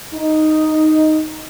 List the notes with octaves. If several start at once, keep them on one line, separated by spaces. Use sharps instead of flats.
D#4